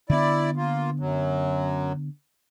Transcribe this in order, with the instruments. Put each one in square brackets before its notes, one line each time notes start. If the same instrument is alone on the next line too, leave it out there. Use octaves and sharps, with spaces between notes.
[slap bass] D3 B3 [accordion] E4 D5
[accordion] A#3 F4
F#2 F#3